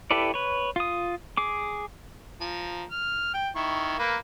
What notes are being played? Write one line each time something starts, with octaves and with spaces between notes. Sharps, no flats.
E4 G4 A4 B4 D5
B4 C#5
F4 D#6
G#4 D6
F3 A#5
F6
G5
D#3 E4 C#6
A#3 A#4 B4